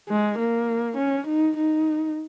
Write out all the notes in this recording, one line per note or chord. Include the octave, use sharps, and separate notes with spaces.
G#3
A#3
C#4
D#4
D#4